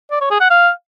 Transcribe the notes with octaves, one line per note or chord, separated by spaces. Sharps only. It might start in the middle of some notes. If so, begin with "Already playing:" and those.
D5
C#5
G#4
F#5
F5